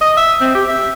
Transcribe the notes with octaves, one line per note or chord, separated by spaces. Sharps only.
D#5
E5
C4
G4
E5